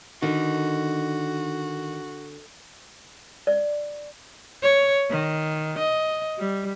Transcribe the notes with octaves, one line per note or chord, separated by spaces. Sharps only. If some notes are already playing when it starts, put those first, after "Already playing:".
D3 D#3 F#4
D5
C#5
D#3
D#5
G3